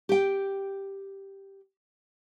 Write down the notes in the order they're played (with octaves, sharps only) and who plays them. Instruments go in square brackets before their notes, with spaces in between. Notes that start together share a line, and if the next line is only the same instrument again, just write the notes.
[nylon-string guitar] G4 G5